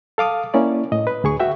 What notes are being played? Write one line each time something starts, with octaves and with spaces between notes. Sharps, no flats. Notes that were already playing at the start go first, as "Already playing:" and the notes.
A4 F5 D6 D#6
A#3 C#4 E4 D5
A2 D#5
B4
D2 G#4 C#6
F#4 E5 G5